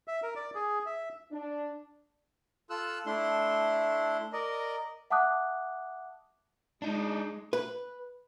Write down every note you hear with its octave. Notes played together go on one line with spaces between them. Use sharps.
E5
A#4
D5
G#4
E5
D4
F4 A4 E6 F#6
A3 D4 E4 C6
A#4 D5 D#5
E5 F#5 A5 D6 D#6 F#6
G#3 D4 D#4
B4